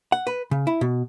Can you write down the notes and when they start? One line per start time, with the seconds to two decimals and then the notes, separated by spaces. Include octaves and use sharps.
0.12 F#5
0.27 B4
0.51 C#3
0.67 E4
0.81 B2